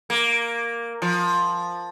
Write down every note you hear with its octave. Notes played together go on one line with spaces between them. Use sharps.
A#3
F3